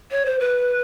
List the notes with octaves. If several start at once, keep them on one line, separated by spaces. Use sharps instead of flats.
C#5
C5
B4